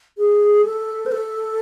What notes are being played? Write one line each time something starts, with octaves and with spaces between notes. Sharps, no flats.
G#4
A4
C5
A4